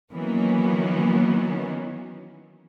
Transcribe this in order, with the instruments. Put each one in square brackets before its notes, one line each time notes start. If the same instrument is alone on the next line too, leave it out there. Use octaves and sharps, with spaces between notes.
[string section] D#3 E3 F#3 A#3 B3 C#4